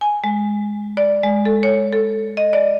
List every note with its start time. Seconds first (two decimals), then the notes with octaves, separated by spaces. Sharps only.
0.01 G#5
0.24 G#3
0.97 D5
1.23 G#3
1.45 A4
1.63 C#5
1.92 A4
2.37 D#5
2.53 D5